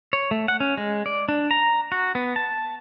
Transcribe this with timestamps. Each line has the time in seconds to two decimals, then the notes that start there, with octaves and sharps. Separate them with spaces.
0.13 C#5
0.31 A3
0.48 F#5
0.60 C#4
0.77 G#3
1.06 D5
1.29 D4
1.51 A#5
1.92 F#4
2.15 B3
2.36 A5